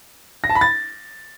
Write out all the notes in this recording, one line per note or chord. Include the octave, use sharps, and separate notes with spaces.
A#6
A5
B5
A6